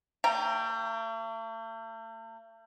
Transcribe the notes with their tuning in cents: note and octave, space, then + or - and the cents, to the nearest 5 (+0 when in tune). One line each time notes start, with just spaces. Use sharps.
A3 +45 G5 +0 A#5 +0